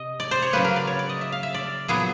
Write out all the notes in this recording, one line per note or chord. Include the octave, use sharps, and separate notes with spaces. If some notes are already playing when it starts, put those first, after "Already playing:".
Already playing: C3 D#5
D5
C5
C#5
C#3 F#3 A#3 B4
A#4
D5
C#5
D5
D#5
E5
F5
E5
D5
A#2 F#3 B3 G#4